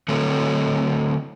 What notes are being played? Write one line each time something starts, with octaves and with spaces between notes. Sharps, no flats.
D3 F#3 A3 C4 A4 C#5